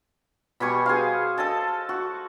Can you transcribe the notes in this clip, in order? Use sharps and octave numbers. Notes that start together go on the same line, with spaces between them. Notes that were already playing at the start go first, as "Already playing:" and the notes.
B2 G3 G#5 C#6
G#4 C5 F5
A4 D#5 A5
F#4